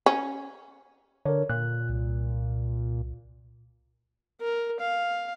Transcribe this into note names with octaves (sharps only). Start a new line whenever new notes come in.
C#4
D3 A#4 C#5
A#2 F#6
C2
A#4
F5